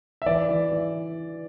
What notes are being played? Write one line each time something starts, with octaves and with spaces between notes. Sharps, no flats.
E5
E3 D5
E3
E3